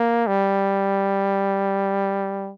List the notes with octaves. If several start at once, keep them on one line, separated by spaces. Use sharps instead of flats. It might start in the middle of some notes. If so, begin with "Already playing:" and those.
Already playing: A#3
G3